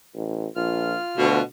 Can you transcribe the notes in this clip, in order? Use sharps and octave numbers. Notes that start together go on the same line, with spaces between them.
A1
A#1 F4 F6
D2 B2